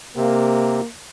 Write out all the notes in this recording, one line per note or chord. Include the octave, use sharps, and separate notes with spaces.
C3 A#3